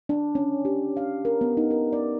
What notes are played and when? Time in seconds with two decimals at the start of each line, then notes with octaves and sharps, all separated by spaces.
0.09 D4
0.35 C#4
0.65 G4
0.97 F5
1.25 A#4
1.41 B3
1.57 D#4
1.71 A#4
1.93 D5